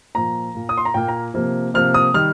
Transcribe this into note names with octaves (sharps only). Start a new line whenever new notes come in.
A#2 F3 A#3 A#5
A#2 A#3
D#6
C6
A#5
A#2 A#3 G5
A#5
C3 F3 A#3
C3 F3 A#3 F6
D#6
D#3 G3 F6